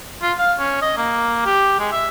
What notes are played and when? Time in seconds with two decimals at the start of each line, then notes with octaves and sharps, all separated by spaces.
0.22 F4
0.39 F5
0.60 C#4
0.82 D#5
0.97 A#3
1.46 G4
1.80 G#3
1.92 E5